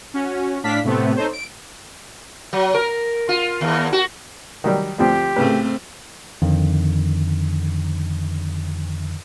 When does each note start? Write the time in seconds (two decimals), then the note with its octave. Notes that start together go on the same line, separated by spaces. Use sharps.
0.14 C#4 F#4
0.64 A2 D4 F5 B6
0.84 A2 C3 A3 B3 C4
1.15 D#4 A4 C5 C#5
1.33 D7
2.53 F#3
2.74 A#4
3.29 F4
3.61 D#2
3.93 F#4
4.64 D#3 F#3 G3
4.98 D2 F3 C4 G4
5.36 A2 C#3 A3 C4 B4
6.42 F2 D3 D#3